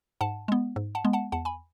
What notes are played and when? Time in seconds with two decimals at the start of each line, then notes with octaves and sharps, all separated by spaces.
0.21 G#2 F#5 A5
0.48 G#3 B3
0.76 G#2
0.95 F#5 A5
1.05 G#3 B3
1.13 F#5 A5
1.32 E2 F#5 A5
1.45 G#5 B5